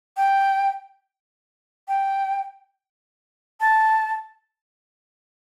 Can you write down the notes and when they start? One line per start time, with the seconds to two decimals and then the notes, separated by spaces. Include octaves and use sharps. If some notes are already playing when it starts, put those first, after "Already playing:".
0.17 G5
1.88 G5
3.60 A5